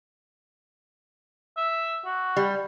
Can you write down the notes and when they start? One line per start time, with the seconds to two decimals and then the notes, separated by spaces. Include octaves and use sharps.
1.57 E5
2.05 F#4
2.37 G3